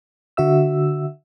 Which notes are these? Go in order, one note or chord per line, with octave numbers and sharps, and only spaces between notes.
D3 F#4 E5 E6